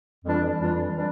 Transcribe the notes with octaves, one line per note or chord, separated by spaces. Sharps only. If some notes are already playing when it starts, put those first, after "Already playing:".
F2 E3 G3 D4 F4
F2 E3 G3 D4 F4
E3 G3 D4